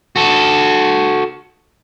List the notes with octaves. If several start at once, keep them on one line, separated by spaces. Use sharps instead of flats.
F#4 A4